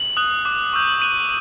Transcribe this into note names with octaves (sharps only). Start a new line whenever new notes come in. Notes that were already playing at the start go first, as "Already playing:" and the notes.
Already playing: F#7
D#6 F#6
D6 F#6
C#6 E6 G6
C#6 F#6 D#7